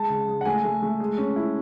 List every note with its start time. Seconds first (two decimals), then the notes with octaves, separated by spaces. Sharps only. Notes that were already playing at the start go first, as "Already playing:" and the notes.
Already playing: G#3 A5
0.10 C#3
0.28 G#3
0.41 F#5
0.45 A3 G#5
0.64 A3
0.82 A3
1.00 G#3
1.18 C#4
1.36 E4